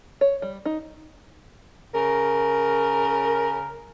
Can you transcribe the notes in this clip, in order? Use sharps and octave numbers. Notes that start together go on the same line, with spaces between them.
C#5
G3
D#4
C#3 A#4